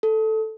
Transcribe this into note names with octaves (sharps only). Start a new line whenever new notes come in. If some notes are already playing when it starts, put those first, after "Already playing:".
A4